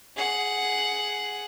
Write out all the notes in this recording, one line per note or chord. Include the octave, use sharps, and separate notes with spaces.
G#4 F#5